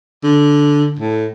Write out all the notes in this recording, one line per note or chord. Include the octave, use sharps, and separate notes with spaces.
D3
A2